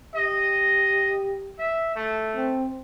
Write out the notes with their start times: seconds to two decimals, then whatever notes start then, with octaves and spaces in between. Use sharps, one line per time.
0.15 G4 D#5
1.58 E5
1.95 A3
2.36 C4